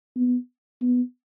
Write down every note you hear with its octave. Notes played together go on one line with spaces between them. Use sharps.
B3
B3